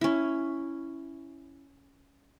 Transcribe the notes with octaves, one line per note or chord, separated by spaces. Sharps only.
C#4 E4